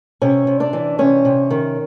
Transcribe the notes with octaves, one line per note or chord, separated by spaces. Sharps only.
C3 C#4 C#5
C3
D4 D5
E3
C3 C#4 C#5
C3
D#3